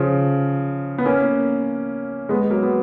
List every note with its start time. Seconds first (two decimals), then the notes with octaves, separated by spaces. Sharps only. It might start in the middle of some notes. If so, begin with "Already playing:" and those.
Already playing: C#3 F3
0.98 B3
1.06 A#3 C#4
2.29 G#3 B3
2.50 F#3 A#3
2.63 B3